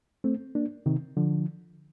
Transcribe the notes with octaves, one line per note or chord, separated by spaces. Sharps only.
A3 C4
A#3 D4
C3 D#3
D3 F3